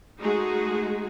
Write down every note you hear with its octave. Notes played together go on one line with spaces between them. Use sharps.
G#3 A3 D#4 F#4 G#4